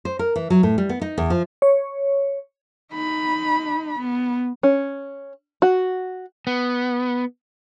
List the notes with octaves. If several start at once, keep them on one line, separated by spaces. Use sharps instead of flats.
C5
A#4
E3
F#3
A2
G3
B3
D#4
E2
F3
C#5
D#4 B5
B3
C#4
F#4
B3